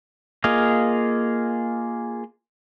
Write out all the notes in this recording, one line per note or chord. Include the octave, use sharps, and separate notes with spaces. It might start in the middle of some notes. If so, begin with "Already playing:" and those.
A#3 F4 G#4 D#5 F5